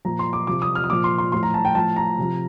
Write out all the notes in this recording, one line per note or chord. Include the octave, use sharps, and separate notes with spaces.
A#2 F3 A#5
C6
D6
C3 F3 D6
D#6
F6
D#6
A#2 F3 D6
C6
C6
A2 F3 C6
A#5
A5
G5
A2 F3 A5
A#5
C3 F3